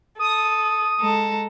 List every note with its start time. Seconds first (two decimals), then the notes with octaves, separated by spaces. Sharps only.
0.19 A4 D#6
1.00 G#3 A4 A#5